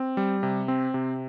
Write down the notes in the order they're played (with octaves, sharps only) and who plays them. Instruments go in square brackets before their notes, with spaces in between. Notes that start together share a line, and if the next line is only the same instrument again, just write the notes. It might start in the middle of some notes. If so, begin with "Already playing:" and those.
Already playing: [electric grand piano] C4
G3
C3
C4
C3